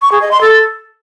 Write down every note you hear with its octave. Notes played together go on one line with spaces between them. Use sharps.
C#6
G#4
D#5
C6
A4